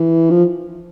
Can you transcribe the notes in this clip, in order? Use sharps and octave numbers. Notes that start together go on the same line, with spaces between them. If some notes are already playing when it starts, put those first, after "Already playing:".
Already playing: E3
F3